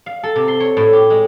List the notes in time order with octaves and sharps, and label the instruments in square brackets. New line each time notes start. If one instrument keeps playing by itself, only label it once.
[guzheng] F5
A4
C3
C6
C#5
A2
G4
G#3